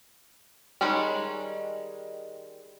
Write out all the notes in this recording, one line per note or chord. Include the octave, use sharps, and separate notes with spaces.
D#3 G3 G#3 C#4